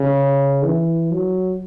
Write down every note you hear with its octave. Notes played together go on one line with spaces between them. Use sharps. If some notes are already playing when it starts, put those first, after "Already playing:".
Already playing: C#3
E3
F#3